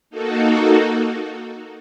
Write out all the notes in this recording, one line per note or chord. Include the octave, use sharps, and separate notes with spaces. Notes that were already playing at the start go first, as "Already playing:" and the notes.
A#3 D#4 F#4 A4